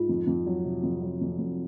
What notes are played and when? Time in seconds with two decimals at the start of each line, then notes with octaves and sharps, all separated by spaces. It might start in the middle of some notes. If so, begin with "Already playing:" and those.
Already playing: G#2 F4
0.09 F2
0.27 F2
0.46 F#3
0.65 C3
0.83 F2
1.02 F#3
1.21 F2
1.39 F2